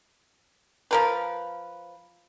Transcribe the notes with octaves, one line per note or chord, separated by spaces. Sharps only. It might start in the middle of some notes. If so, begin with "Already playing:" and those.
F3 A#4 B4